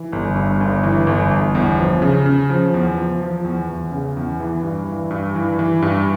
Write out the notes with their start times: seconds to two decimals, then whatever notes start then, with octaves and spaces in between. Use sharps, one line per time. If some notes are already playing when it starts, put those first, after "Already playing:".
Already playing: E3
0.13 G1
0.36 G2
0.61 G1
0.83 E3
1.07 G1
1.31 G1
1.55 E2
1.79 F3
2.02 C#3
2.26 C#3
2.50 F3
2.74 E2
2.97 F3
3.22 F3
3.45 E2
3.69 E2
3.92 C#3
4.17 E2
4.40 E3
4.63 G2
4.88 E3
5.11 G2
5.35 E3
5.59 E3
5.82 G2